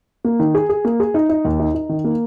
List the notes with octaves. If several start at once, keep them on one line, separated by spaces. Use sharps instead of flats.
A#3
D#3
G#4
G#4
A#3
G#4
D#4
D#4
D#2
D#4
D#4
D#3
A#3